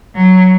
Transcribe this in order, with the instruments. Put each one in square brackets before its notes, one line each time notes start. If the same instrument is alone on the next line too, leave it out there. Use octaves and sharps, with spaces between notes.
[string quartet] F#3